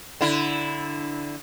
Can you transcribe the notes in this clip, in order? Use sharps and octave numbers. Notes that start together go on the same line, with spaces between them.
D3 E4